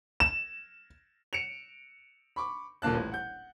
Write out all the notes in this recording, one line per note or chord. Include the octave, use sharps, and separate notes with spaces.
E7
C#7 D7 E7 F7
B5 C#6 D6
D#1 A#2 A#3 A5 F#6
A1
F#5 G6